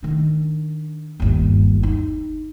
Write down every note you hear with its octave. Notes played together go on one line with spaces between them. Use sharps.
D#3 D4
G1 D#2
D#4